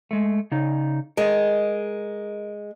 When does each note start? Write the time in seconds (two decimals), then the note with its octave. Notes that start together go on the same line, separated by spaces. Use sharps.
0.11 G#3 A3
0.51 C#3 D#4
1.17 G#3 A#4 D#5